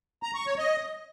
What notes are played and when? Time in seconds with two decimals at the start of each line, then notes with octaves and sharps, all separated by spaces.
0.23 A#5
0.35 C#6
0.47 C#5
0.58 D#5